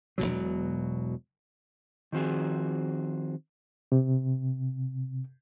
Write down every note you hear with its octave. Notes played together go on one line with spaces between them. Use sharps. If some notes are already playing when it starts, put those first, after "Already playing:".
E1 C#2 B2 F#3
D#3 F3 C4 F#4 G#4
C3